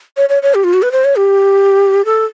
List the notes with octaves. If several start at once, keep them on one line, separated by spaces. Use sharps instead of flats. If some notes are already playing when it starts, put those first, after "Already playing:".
C#5
C#5
C#5
G4
F4
F#4
B4
C5
C#5
G4
A4